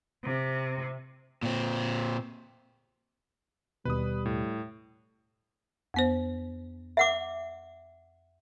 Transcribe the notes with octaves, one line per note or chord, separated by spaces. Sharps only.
C3
A#2 C4
D#2 B2 G3 B4 D#6
A2
F2 B3 C5
E5 F#5 D6